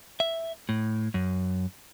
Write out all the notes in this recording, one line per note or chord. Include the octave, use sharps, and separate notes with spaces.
E5
A2
F#2